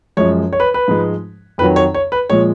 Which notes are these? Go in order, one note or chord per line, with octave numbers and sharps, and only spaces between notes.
F#2 F3 G#3 C#5
C#5
B4
B4
G#2 F3 G#3
F2 D#3 F#3 B4
C#5
C#5
B4
A#2 F3 G#3 C#5